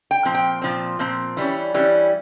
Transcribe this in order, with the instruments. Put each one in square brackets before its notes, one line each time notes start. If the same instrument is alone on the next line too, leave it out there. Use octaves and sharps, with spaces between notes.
[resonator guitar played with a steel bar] G5
A#2 F3 C4
G5
A#2 F3 C4
A#2 F3 C4
E3 G3 C#4
E3 G3 C#4